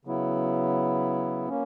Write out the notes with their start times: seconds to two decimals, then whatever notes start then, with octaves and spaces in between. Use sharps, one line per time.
0.05 C#3 F#3 B3 E4
1.49 A#3 C#4